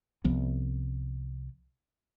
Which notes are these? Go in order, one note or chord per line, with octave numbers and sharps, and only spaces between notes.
C2 F3 B3